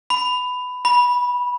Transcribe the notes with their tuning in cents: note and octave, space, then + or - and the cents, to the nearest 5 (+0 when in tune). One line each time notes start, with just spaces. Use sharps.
B5 +15
B5 -15